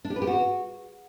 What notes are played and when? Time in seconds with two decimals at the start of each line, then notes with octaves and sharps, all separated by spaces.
0.05 D4
0.10 G4
0.16 B4
0.22 G4
0.27 F#4